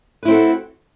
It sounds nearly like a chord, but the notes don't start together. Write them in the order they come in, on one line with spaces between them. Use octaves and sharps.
B4 E4 C4 A4 F#4